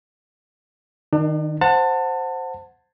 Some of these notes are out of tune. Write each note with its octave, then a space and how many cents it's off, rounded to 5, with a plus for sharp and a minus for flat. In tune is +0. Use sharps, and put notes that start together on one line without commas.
D#3 -5 D4 +40
C5 +0 F#5 -10 A5 +25